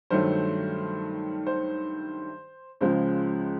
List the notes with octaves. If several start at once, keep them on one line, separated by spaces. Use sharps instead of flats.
G2 D#3 F#3 A3 C5
C5
C#2 C#3 F3 G#3 C5